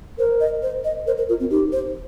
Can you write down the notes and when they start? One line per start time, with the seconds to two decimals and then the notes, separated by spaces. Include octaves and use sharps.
0.19 A#4 C5
0.41 D#5
0.63 C5
0.84 D#5
1.06 A#4 C5
1.18 A#4
1.29 F4 A#4
1.40 C4
1.50 D#4 G4
1.72 C5